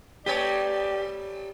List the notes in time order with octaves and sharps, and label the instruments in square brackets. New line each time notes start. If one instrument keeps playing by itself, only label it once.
[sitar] G3 A3 C#5 [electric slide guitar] G4 [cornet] D5